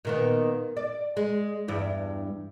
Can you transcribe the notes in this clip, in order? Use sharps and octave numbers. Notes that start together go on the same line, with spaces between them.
A#2 D#3 B3
D5
G#3
E2 G2 E4